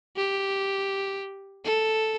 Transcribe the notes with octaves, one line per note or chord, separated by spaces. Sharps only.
G4
A4